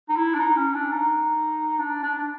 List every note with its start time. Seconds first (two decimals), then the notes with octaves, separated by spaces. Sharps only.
0.09 D#4
0.17 E4
0.34 D4
0.39 D#4
0.57 C#4
0.74 D4
0.92 D#4
1.79 D4
2.03 D4
2.19 D4